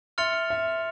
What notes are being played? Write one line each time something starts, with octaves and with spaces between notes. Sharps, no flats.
E5 C6 F6 A6 C#7 F7
E5